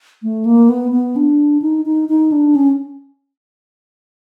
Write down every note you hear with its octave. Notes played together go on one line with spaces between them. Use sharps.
A3
A#3
B3
B3
D4
D#4
D#4
D#4
D4
C#4